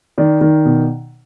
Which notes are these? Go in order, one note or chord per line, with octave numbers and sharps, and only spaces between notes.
D#3 D5
D#3
B2